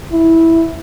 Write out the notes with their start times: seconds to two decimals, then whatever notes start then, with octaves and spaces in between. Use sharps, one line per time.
0.12 E4